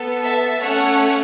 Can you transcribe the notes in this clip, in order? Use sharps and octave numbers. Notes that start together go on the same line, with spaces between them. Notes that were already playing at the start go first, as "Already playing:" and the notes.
Already playing: B3 A4
E5 A5
A3 C#4 A4 C#5 F#5